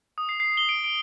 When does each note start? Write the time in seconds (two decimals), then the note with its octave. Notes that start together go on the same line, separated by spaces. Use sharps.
0.18 D#6
0.29 C7
0.40 C7
0.57 G7
0.69 D7
0.84 D7